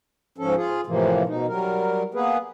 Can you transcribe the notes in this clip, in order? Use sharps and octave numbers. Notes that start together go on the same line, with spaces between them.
G#2 F3 C#4 A4
F4 G#4
A2 C3 E3 F3 A#3
B2 D#4
F#3 G3 A#4
A#3 B3 G#4 B4